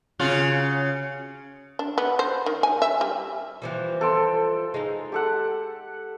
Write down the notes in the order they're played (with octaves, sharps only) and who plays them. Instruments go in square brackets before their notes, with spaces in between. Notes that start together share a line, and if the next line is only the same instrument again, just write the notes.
[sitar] C#3 F4 F#4
[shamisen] D4
B3
C5
D#3
G#5
E5
G3
[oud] E3 F3 G3
[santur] A4 G5 C6
[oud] G#3 D#4
[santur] G4 A4 F#5